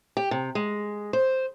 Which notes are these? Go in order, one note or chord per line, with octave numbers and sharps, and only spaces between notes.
G4
C3
G#3
C5